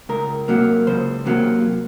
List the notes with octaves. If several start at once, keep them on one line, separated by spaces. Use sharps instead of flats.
C#2 A#4
C3 F#3 A#3
C#2 C5
C3 F#3 A#3